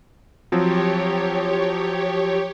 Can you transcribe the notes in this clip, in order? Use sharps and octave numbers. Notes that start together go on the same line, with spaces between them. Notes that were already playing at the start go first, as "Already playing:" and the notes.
F3 F#3 C4 G4 C#5